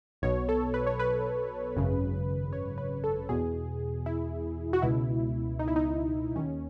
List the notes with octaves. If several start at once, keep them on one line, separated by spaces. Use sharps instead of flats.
B1 B2 C#5
A4
B4
C#5
B4
G#1 F#2 C#3
C#5
B4
A4
E2 B2 G#4
E4
F#4
C#2 B2 E4
D#4
E4
D#4
D#2 D#3 C#4